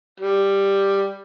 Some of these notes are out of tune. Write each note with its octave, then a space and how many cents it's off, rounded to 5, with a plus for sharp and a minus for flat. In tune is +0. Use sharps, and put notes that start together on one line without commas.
G3 +5